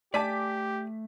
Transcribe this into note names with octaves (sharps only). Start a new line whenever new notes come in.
A3 G4 D5 G#5 A5 D6 B6